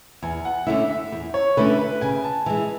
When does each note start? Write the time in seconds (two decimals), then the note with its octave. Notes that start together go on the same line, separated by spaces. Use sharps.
0.22 E2 G#5
0.45 F#5
0.67 D3 A3 C#4 E4 E5
0.89 E5
1.12 E2
1.34 C#5
1.57 D3 A3 C#4 E4 B4
1.79 B4
2.01 C#3 G#5
2.24 A5
2.46 E3 G#3 G#5